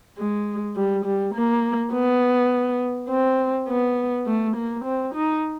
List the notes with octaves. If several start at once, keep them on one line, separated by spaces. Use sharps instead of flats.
G#3
G3
G3
A#3
B3
C4
B3
A3
A#3
C4
D#4